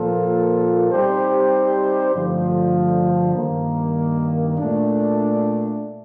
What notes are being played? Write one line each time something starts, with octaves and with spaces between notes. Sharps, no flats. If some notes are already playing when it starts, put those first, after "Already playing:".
Already playing: A#2 F3 A#3 F4 A4
G3 C4 D#4 G4 C5
G2 D3 F3 A3
G2 D#3 A#3
A#2 A3 D4